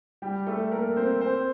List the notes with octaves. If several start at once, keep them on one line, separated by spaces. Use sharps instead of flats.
G3 G4
A3 A4
A#3 A#4
C4 C5
C4 C5